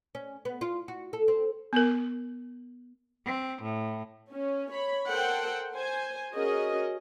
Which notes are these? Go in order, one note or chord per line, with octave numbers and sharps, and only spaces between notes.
C#4
B3
F4
F#4
A4
C4
B3 A#4
C4
A2
C#4
C#5 B5
A4 A#4 C5 F#5 G5
C5 G#5
C#4 F#4 G#4 A#4 D#5